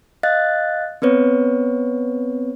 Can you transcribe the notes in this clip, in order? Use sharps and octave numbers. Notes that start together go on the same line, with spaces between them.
D#5 F5 F#6 A6
B3 C4 B4 C#5